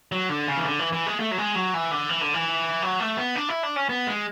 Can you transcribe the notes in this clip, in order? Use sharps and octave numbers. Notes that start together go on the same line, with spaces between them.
F#3
D3
C#3
E3
D3
E3
E3
G#3
A3
F#3
G#3
F#3
E3
D3
E3
D3
E3
F#3
A3
B3
D4
E4
D4
C#4
B3
G#3